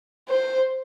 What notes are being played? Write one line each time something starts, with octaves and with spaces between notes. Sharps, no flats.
C5